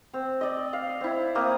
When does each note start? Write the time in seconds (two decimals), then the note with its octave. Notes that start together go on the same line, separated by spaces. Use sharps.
0.14 C4
0.41 D5 D#5
0.73 F5
1.01 C4 E4
1.35 A#3 C4 D#6